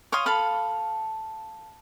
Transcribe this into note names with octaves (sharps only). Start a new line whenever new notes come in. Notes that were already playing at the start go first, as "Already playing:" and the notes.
C#5 F5 C6 D#6
A4 F5 B5